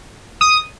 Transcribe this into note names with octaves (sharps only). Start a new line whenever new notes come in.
D#6